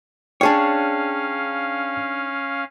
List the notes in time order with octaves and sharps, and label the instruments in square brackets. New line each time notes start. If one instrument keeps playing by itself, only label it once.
[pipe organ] C#4 F5 [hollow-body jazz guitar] D4 G#4 C#5 [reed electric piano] G5 A5